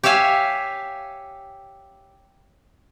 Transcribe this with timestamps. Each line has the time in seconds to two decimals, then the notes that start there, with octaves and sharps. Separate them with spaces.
0.03 G4 C#5 E5 F5 G#5